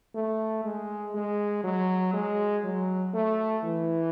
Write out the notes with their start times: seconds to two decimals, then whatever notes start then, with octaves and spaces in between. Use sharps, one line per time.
0.15 A3
0.64 G#3
1.14 G#3
1.64 F#3
2.13 G#3
2.64 F#3
3.14 A3
3.64 E3